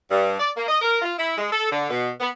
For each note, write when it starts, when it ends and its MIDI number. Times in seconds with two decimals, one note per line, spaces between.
0.11 0.36 43
0.40 0.51 74
0.56 0.66 58
0.69 0.78 75
0.82 1.00 70
1.02 1.13 65
1.18 1.36 64
1.37 1.50 56
1.52 1.70 69
1.72 1.86 50
1.90 2.10 47
2.20 2.29 59